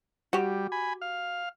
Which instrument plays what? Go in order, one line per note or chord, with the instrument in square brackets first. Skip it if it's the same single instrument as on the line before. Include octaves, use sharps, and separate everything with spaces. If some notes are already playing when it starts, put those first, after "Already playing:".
[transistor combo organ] G3 [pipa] F#4 G4
[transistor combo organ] G#5 B5
F5